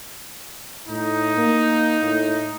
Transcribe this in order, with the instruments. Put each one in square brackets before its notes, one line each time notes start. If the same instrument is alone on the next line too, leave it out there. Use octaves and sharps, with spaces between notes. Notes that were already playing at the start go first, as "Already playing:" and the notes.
[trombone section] A2 [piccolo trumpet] D#4
[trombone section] A#3
A2